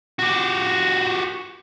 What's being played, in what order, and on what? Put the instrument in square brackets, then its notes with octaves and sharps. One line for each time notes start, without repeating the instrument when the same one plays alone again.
[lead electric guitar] F#4 G4